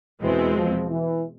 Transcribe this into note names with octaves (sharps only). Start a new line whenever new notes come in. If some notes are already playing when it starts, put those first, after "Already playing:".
E2 B2 E3 G#3 C4
F3
E3